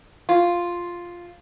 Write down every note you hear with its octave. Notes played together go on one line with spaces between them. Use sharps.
F4